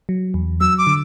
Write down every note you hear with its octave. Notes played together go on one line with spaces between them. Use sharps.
F#3
E2
F#3 E6
D6
D3